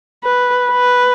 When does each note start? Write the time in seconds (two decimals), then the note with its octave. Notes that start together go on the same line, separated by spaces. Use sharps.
0.24 B4
0.70 B4